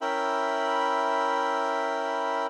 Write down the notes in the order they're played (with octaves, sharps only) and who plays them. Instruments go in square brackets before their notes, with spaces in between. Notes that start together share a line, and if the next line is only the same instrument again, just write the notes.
[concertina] C#4 E4 A#4 E5 G5 B5